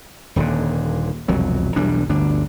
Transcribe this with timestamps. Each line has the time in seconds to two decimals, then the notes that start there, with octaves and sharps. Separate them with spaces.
0.36 D#1 D#2 A#2 D3
1.28 E1 C2 F2 F#3
1.76 B1 E2 G3 D4
2.09 G1 D2 D4